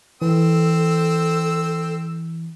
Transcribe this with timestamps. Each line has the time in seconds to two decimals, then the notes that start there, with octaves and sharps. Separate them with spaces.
0.22 E3 C4 A4 E6